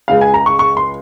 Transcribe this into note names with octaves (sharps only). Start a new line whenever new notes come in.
C#2 C#3 G#3 F5
G#5
A#5
C#6
C#6
C6